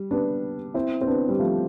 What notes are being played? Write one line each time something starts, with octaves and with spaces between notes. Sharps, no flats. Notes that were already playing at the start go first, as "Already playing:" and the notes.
Already playing: G3
B3 D4
C4 E4
C4
B3 D4
G3
F3 A3